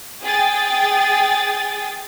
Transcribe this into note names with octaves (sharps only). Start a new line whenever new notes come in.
G#4 G5 A6